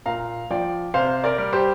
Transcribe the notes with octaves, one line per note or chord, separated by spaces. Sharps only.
A#2 F5 A#5
F3 D5 G5
C3 C5 F5
A#4 D5
G3
G4 C5